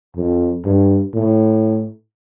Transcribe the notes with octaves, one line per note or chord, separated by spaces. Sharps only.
F2
G2
A2